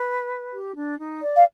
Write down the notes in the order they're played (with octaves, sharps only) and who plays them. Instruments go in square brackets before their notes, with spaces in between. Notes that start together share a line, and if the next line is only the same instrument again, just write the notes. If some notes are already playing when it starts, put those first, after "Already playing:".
Already playing: [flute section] B4
G4
D4
D#4
D5
[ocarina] F5